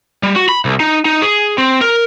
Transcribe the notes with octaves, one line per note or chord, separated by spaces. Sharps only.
G3
F#4
B5
C2
D#4
D#4
G#4
C4
A#4